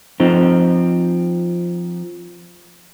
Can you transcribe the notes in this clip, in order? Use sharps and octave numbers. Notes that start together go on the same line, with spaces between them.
F3 C4 D#4